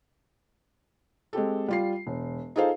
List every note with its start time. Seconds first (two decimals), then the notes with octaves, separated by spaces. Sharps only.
1.33 G#3 C4 G4 A4
1.68 G3 F4 C7
2.07 E1
2.56 D#4 F4 G#4 A4 C5 F5